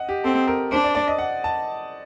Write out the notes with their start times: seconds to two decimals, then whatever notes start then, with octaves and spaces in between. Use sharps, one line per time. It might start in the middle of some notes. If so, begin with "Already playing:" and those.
Already playing: D#5 F#5
0.09 G4
0.24 C4 A4
0.48 A#4
0.72 D4 C5
0.84 D5
0.95 D5
1.08 D#5
1.18 F#5
1.44 A5